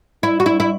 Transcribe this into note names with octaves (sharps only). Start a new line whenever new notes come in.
E4
F#4
E4
E4